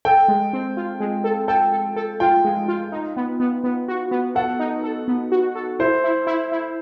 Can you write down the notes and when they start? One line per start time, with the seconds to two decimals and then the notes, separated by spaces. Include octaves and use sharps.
0.05 A4 G5
0.28 G#3
0.53 C4
0.77 F4
1.00 G#3
1.24 A4
1.48 A4 G5
1.72 A4
1.96 A4
2.20 F4 G5
2.45 G#3
2.68 F4
2.92 D#4
3.17 B3
3.40 B3
3.64 B3
3.88 F#4
4.11 B3
4.35 A4 F#5
4.59 D#4
4.84 A4
5.08 B3
5.32 F#4
5.55 A4
5.79 E4 C5
6.04 E4
6.27 E4
6.52 E4